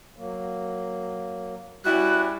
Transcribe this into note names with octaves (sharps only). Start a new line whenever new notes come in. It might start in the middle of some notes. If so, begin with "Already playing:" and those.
F#3 A#3
G3 C#4 E4 F#4 F#6